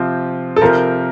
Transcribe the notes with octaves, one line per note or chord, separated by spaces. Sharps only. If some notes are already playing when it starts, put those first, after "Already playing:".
Already playing: C3 F3 C4 F4
A4
C3 F3 C4 F4 A#4